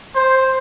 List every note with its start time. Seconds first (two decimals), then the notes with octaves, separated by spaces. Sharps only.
0.14 C5